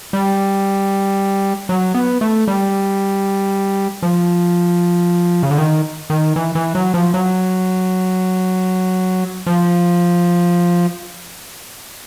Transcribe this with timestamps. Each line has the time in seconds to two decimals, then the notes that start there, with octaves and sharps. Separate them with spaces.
0.13 G3
1.69 F#3
1.94 B3
2.21 A3
2.47 G3
4.02 F3
5.43 C#3
5.51 D3
5.58 D#3
6.10 D#3
6.36 E3
6.55 E3
6.75 F#3
6.94 F3
7.14 F#3
9.46 F3